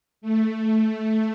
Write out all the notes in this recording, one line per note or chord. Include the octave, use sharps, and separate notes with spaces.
A3